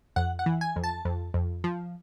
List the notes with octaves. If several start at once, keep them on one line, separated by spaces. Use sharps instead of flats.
F2 F#5
F#5
E3
G#5
F2
A5
F2
F2
F3